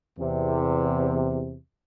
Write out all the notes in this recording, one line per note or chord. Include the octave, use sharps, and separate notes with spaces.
E2 C3